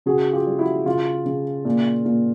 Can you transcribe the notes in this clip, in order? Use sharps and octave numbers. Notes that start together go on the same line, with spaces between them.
C#3 F#4 G#4
F4 G4
G3
E4 F#4
C#3 F4
C#3
A#2
A#2